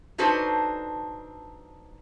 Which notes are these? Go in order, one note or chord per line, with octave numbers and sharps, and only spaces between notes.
D4 D#4 F#4 A4 B4 C5